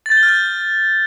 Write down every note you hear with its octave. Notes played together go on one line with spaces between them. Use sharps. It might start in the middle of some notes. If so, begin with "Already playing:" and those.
A6
G6
G7
F6
G6